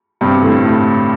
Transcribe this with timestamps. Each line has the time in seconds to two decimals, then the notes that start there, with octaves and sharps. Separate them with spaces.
0.21 G2 C3
0.42 A2 D3
0.64 A2